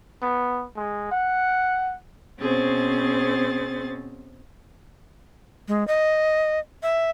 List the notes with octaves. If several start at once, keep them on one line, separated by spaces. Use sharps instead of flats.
B3
G#3
F#5
B2 C4 C#4 G#4 C5 A6
G#3
D#5
E5